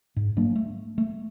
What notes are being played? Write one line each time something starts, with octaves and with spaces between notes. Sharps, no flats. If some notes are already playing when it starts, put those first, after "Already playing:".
G#2
F#3 A#3 D4
A3
A3